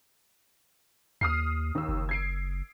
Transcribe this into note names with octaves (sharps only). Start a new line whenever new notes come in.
D#2 D#6 F6 C7
D#2 E6
F#1
G#6 C7 D7